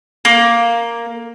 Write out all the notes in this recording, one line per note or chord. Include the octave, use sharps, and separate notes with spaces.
A#3